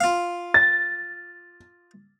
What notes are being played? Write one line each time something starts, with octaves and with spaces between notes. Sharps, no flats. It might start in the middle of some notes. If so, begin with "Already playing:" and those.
F4 F5
A6